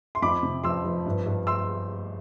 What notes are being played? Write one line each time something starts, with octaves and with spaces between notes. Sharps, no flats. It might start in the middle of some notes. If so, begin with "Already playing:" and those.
C6
F2 B5 D6
C3
F3 C6 E6
F3
G2
G2
C6 E6